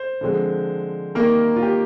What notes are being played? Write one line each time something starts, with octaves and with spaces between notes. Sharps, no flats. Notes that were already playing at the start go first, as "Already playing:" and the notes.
Already playing: C5
D3 F3 G#3 C4
C3 D#3 G3 A#3 A#4
F4
G4